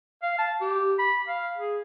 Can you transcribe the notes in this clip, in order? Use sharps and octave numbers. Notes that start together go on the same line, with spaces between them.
F5
A5
G4
B5
F5
G#4